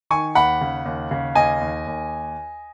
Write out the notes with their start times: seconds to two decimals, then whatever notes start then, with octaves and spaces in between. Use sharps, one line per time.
0.11 D#3 G#5 C#6
0.35 D#2 F#5 B5
0.61 C#3
0.86 D#2
1.11 C#3
1.35 D#2 D#5 G#5
1.61 D#2
1.86 D#2